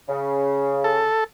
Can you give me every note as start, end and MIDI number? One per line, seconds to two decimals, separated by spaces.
0.09 1.04 49
0.84 1.24 69